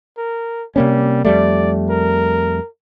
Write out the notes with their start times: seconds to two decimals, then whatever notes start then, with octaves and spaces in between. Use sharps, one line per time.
0.17 A#4
0.76 C3 G3 A#3 C#4
1.24 F2 G3 A3 D5
1.89 A#4